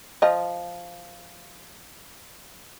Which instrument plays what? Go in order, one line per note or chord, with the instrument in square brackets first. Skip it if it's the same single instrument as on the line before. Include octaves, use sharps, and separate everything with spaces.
[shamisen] F3 D#5